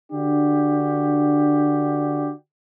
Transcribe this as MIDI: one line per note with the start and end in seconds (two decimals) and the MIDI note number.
0.12 2.32 50
0.12 2.32 62
0.12 2.32 66
0.12 2.32 67